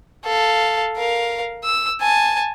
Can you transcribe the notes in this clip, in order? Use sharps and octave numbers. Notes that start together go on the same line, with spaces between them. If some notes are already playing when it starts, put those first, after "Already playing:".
A4 F5
A#4 F5
E6
G#5 A5